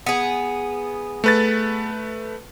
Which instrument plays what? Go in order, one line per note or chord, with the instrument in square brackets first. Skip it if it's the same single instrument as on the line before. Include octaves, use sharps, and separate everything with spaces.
[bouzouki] B3 G#4
[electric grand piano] A3 B4 A6